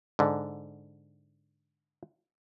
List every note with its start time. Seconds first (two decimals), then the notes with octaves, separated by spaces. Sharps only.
0.19 G#2 D3